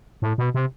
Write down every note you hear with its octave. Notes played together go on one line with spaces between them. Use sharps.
A2
B2
C3